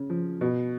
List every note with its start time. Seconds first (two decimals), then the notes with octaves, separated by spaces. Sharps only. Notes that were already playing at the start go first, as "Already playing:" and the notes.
Already playing: C#3
0.10 F3
0.41 B2